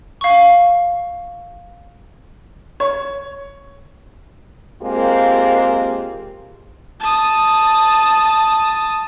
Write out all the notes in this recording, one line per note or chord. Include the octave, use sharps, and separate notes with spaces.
F5 C#6
C#5
G#3 A#3 C4 F4 G4
A5 D#6